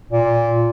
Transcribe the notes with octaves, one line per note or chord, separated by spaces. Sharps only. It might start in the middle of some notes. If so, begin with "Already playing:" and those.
A#2